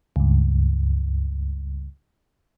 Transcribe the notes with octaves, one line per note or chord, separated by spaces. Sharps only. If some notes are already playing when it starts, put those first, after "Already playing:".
C#2 G2